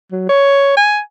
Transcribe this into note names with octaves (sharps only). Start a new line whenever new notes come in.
F#3
C#5
G#5